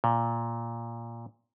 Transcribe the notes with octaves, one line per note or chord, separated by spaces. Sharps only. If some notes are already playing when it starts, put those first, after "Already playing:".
A#2